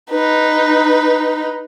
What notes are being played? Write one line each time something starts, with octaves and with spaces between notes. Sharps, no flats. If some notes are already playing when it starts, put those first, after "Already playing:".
D#4 B4